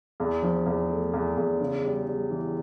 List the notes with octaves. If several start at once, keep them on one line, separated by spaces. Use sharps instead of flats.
E2
F3
E2
A3
E2
E2
C#3
G3
G3
E3